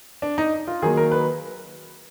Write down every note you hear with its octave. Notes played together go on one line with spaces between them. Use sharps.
D4
D#4
F4
D#3 F#3 A#3 G#4
A#4
B4